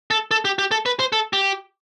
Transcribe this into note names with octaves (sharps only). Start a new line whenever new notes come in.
A4
A4
G4
G4
A4
B4
C5
A4
G4